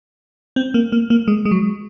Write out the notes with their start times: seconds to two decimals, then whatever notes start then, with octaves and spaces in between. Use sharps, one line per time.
0.56 C4
0.74 A#3
0.92 A#3
1.10 A#3
1.28 G#3
1.45 G#3
1.51 F#3